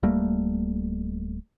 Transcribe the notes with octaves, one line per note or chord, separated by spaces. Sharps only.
D1 G3 A3 A#3